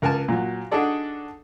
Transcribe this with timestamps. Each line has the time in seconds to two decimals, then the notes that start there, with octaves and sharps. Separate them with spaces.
0.02 C#2 A#4 G#5 A5
0.28 A#2 F#3
0.72 D4 D#4 F#4 G#4 A4 D5